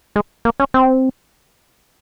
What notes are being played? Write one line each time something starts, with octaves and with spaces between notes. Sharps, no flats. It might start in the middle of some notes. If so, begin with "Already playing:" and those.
G#3
A#3
C#4
C4